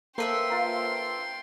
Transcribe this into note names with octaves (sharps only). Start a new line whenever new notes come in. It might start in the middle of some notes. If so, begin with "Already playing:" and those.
A#3 A4 B4 C5 E5 G5 C6 C7
F4 A#5